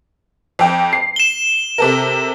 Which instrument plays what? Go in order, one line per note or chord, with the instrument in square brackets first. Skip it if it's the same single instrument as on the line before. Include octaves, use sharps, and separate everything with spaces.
[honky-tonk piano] F2 G5
C7
[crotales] E7 G7
[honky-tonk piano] C3 A4 A#4